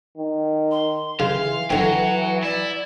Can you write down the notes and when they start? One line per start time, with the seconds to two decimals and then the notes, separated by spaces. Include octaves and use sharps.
0.17 D#3
0.71 C6
1.20 C#3 E3 F5
1.70 D3 F#3 C4 F#5
2.44 E4 D5